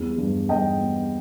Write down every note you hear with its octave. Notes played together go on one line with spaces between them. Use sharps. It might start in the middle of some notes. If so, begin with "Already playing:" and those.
Already playing: E2 G3
G2
G2 D#5 G5
B3